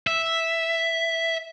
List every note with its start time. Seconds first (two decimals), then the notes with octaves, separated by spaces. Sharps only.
0.07 E5